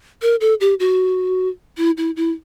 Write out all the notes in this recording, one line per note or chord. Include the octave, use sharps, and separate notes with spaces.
A#4
A4
G4
F#4
E4
E4
E4